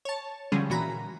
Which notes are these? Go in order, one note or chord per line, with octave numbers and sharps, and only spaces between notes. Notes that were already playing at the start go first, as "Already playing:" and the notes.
C#5 A5
D3 F3 G3 G#3 C#4 G#4
A#2 E3 F#4 A#5 B5